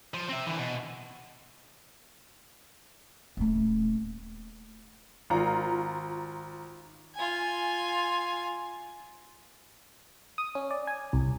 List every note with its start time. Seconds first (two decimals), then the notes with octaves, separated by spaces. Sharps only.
0.14 F3
0.29 C4 E5
0.47 D3 E3
0.59 B2
3.37 D#1 A3
5.30 G#1 F4 A#5
7.15 F4 G#5
10.38 D#6
10.55 C#4
10.71 D5
10.87 G#5
11.13 C2